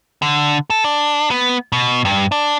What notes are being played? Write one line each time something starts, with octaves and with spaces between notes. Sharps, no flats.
D3
A4
D4
B3
B2
G2
D4